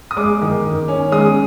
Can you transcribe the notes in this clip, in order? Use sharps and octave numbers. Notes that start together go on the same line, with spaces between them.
D#6
G#3 D6
D#3
D#3
C#4
G#3 D#6